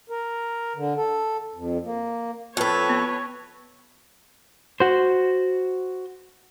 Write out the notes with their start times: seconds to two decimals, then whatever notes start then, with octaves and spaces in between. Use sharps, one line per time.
0.10 A#4
0.76 D3
0.97 A4
1.55 F2
1.85 A#3
2.57 F2 A4 B4 C#5 G5 A5
2.89 B3
4.80 F#4 C5